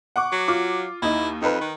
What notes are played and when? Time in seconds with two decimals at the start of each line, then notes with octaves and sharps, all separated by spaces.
0.16 F#5 C#6 D6
0.32 F#3
0.48 F4 D6
1.02 D#2 D#4 E4
1.42 F2 D#4 B4
1.61 D#3